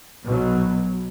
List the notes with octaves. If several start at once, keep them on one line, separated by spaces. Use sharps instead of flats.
B1 B2 F#3